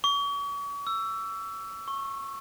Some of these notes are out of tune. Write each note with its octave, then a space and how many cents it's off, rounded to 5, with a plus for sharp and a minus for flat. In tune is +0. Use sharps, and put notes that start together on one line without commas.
C#6 +40
E6 +15
C#6 -15